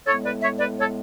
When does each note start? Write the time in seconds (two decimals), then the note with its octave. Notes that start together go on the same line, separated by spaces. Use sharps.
0.06 A2 G#3 B3 A4 C#5
0.24 B4 D5
0.42 C#5 E5
0.59 B4 D5
0.78 A4 C#5